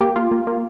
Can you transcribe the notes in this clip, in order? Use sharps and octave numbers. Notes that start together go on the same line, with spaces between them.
A#3 G4
A#3 F4
A#3
A#3